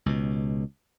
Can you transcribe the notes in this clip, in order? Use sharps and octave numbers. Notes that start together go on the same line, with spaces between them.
C#2 B2